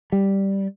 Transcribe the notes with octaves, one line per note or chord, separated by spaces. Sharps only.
G3